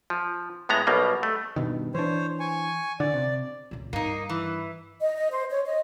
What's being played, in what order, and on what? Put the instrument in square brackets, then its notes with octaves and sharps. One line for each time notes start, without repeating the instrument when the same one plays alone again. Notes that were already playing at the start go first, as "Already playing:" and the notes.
[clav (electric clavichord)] F3
A2 G#3 B3 A#5
B1 B2 G3 A#3
A3
[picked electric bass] G2 B2 D#3
[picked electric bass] E3 D4 [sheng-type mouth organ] C5 C#5
[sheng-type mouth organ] G#5 C#6
[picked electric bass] D3 [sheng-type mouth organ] D5
[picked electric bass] C3
[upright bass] C#2 A#2
[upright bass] G2 [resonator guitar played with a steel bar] A#3 D#4
[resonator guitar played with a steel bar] E3
[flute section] D#5
D#5
C5
C#5
D#5